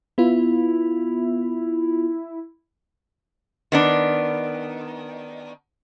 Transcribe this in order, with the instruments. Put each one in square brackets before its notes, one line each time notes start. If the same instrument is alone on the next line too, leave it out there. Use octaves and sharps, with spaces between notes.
[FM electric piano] B3 F4 [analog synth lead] E4
[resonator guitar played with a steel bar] D#3 B3 D4